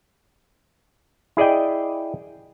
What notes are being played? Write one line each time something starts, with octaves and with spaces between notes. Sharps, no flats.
E4 G#4 D5 D#5 G5